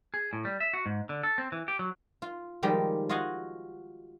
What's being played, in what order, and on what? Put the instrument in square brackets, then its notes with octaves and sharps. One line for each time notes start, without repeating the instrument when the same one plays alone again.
[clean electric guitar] G#4
A2
G3
E5
F#4
G#2
D3
A4
C4
E3
G4
F#3
[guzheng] F4
D#3 F3 G3 G#3 G4 D#5
F4 F#4 D#5 F5 F#5 G#5